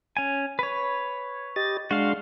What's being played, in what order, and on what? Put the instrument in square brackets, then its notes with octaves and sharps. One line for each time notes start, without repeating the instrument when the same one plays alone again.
[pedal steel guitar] C#4 G#5
B4 C#5
[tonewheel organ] G4 D#5 A6
[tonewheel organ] G#3 D4 C6 [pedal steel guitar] F#4 F5